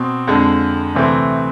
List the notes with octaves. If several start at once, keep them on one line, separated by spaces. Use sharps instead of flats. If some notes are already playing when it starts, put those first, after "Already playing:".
Already playing: B2 C4
F2 D3 G#3
D2 C3 E3 A3 C4